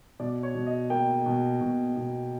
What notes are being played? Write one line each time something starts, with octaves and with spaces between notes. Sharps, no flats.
B2 D5
C#5
B2
D#5
A#3 G5
B2
B2
B2